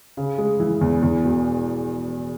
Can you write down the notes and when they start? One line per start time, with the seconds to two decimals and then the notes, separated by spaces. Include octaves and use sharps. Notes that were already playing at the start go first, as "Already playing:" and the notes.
0.17 C#3
0.38 G#3
0.60 E3
0.81 E2
1.02 E2
1.24 E1